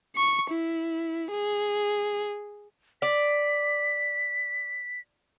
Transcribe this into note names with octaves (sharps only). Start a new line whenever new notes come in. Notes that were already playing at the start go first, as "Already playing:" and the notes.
C#6
E4
G#4
D5 B6